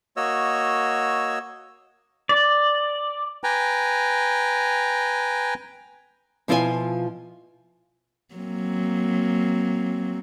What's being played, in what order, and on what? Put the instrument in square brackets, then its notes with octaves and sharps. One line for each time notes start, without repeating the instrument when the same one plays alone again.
[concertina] A#3 F#4 C#5 D#5 E6
[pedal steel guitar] D5
[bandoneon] B4 G5 G#5 A#5
[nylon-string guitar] B2 F3 E4 F4 C5 G#5
[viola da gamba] F#3 A#3 C4